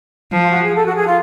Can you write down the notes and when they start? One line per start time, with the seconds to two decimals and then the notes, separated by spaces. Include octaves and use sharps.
0.33 F3
0.39 F4
0.50 F#4
0.63 G#4
0.75 A4
0.85 F#4
0.95 G#4
1.07 F4